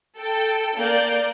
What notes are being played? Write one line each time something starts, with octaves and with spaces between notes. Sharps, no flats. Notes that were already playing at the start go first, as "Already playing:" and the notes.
A4 G5
A#3 D5 G6